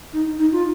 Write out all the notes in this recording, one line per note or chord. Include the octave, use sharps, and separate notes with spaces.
D#4
D#4
F4